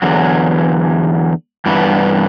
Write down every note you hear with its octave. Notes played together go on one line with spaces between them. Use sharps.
E2 D3 F#3
G2 E3 B3